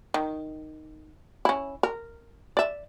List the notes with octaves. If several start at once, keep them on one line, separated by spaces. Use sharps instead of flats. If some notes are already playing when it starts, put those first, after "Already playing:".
D#3
C#4 E4
A#4
D5 E5